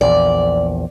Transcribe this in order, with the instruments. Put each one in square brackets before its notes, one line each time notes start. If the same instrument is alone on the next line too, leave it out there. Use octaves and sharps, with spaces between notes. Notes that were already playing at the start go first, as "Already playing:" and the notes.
[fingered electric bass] A#1 E2 [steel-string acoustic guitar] D5